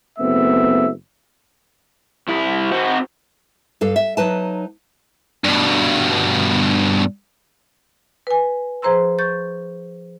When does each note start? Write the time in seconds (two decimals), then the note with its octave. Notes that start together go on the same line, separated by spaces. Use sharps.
0.19 F#1 A3 B3 C4 E5
2.28 C2 E4
2.71 C4 F#4
3.81 G2 A4 F5
3.96 E5
4.17 F#3 D#4 B4 A5
5.44 G2 B2
8.27 B4 G#5
8.82 F3 G#4 C5 A#5 C6 E6
9.19 C#6 G6 A6